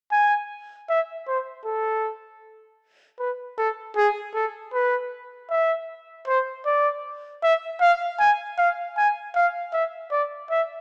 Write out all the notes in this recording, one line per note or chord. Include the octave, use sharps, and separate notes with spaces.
G#5
E5
C5
A4
B4
A4
G#4
A4
B4
E5
C5
D5
E5
F5
G#5
F5
G#5
F5
E5
D5
E5